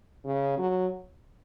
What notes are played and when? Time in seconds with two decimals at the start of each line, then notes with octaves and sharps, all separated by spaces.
0.25 C#3
0.58 F#3